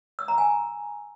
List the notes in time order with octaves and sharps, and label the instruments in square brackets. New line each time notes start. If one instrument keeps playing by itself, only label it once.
[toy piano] E6
A#5
G#5